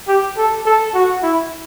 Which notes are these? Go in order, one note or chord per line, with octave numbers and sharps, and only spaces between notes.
G4
A4
A4
F#4
E4